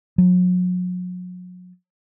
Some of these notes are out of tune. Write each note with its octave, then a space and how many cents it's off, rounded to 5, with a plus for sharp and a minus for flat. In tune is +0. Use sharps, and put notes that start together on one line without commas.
F#3 -40